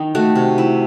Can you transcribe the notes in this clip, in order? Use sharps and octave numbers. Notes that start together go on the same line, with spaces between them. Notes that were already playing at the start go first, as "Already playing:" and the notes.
Already playing: D#3 D#4
A3 F#4
C3
E4